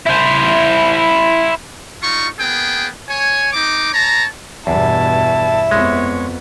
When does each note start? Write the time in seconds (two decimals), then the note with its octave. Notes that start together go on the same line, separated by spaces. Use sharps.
0.07 E4 C5
2.02 G3 D#4 F4 C#6
2.39 A#3 B3 G#4 G5
3.08 C#5 G#5
3.53 C4 D#4 D6
3.93 C#5 A5 A#5
4.67 E2 G2 B2 E4 A5
5.71 F2 G#3 B3 C#5